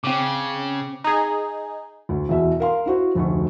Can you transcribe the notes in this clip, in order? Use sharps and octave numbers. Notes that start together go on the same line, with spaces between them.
C#3 C4 D6
D#4 G#4
D2
E2 B2 E5
A#4 F5 C6
E4 F#4 C5
F1 D2 C#6